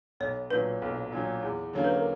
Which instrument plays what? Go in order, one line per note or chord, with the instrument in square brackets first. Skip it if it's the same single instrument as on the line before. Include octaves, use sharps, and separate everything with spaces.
[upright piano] B1 [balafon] C#5
[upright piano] A#2 F#3 [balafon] B4
[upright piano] B1
A#2 F#3
E2
[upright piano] D3 F#3 A#3 C#4 [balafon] C#5
[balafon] B4
A#4